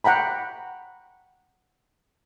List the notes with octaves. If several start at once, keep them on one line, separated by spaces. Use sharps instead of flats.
F#5 G5 A#5 B5